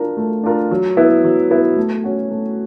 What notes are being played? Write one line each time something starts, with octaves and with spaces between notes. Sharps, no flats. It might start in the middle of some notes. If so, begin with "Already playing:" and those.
Already playing: D4 F4 A#4
A3
D4 F4 A#4
F#3
B3 E4
F#3
B3 E4
A3
C#4 F#4
A3